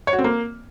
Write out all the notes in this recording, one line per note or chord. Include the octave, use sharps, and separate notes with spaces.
C#5
F#4
C4
A#3